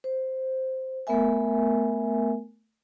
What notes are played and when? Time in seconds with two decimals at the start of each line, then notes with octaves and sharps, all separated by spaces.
0.04 C5
1.07 A3 B3 A#4 E5 G#5